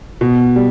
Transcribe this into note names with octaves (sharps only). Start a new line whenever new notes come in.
B2
G3